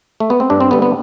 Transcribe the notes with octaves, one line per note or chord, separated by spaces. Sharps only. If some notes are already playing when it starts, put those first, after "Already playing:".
A3
B3
C4
G2 D4
C4
D3 G3 B3
B3